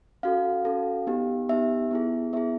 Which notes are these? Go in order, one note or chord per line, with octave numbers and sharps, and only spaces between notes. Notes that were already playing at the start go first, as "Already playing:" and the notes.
C#4 F#4 A4 F5
C#4 F#4 A4
B3 D#4 G4
B3 D#4 G4 E5
B3 E4 G#4
B3 E4 G#4 E5